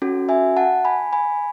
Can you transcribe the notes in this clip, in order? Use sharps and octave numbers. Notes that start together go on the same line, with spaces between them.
C#4 F#4 A4
E5 G#5
F#5 A5
G#5 B5
G#5 B5